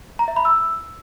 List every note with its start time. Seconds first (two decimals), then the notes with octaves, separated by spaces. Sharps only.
0.19 A#5
0.28 E5
0.36 B5
0.45 E6